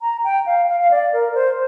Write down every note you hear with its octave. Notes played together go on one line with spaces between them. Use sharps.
A#5
G5
F5
F5
F5
D5
A#4
C5